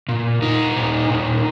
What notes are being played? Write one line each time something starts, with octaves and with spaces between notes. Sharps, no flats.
A#2
A#2 D#4
A#2
A#2